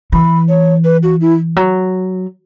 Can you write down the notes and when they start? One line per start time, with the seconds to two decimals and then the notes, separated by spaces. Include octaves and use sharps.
0.12 E3 B5
0.49 C#5
0.84 B4
1.03 F#4
1.21 E4
1.56 F#3